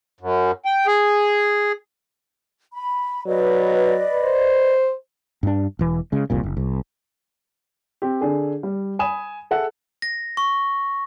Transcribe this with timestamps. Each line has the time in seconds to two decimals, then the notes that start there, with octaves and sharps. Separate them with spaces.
0.21 F#2
0.65 G5
0.87 G#4
2.73 B5
3.26 F#3 B4 D5 D#5
4.23 C5
5.43 G2 D4
5.79 E1 E3
6.12 C#3 G#3
6.30 F1 C2 A#2
6.43 F#1
6.57 C2
8.02 C4 G4
8.21 D3 D4 G#4 A4
8.63 G3
8.99 G#5 B5 D#6 E7
9.51 G#4 A4 E5 F#5
10.02 A#6
10.37 C#6